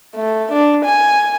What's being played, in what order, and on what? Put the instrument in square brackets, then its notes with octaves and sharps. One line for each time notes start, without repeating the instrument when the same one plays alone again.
[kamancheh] A3
D4
G#5